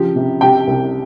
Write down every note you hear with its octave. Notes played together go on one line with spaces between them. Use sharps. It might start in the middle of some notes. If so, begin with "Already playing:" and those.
Already playing: C#3 F3 G4
C3
C3 G4 G5
C2